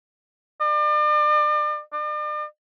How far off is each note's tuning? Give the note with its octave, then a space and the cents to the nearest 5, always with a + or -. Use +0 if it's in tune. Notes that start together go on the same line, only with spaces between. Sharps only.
D5 +40
D5 +45